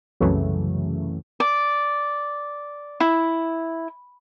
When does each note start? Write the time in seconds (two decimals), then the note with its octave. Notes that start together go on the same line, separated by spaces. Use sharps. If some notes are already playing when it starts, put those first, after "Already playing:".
0.20 C2 F#2 C#3 E3 F#3 A3
1.40 D5
3.00 E4